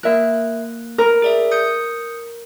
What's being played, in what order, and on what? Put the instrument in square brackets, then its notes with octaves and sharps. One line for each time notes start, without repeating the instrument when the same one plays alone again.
[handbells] A#3 F#6 [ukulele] A#4 E5
[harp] A#4 [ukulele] B4
[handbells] G#4 D5 E5
D#6 G6 C#7